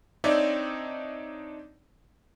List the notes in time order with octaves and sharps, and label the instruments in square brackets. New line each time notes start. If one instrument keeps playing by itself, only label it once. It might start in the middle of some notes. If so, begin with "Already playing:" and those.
[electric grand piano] C4 D4 D#4 C#5 D5 E5